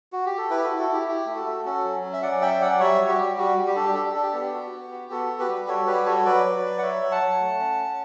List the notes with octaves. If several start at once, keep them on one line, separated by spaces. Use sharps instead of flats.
F#4
G4
A4
E4 G4 B4
E4 F#4 A4
F#4 A4
E4
G4
E4 G4
A3
F#4 A4
A3
C#4 F#4 A4
F#3
C#4
E5
F#3 D5 F#5
C#4 E5 G5
F#3 D5 F#5
G3 C#5 E5
F#4
G4
G3
G3 F#4
G3
G4
D4 A4
G4
D4 A4
G4
D4 A4
G4
B3 A4
G4
F#4
B3
F#4
B3 F#4 A4
F#4
G4 B4
G3
F#4 A4 C#5
G3 G4 B4
F#4 A4 C#5
C#5
F#3 B4 D5
F#3
F#3
F#5
F#3 C#5 E5
F#3
F#5 A5
F#3
A3
C#4
C#4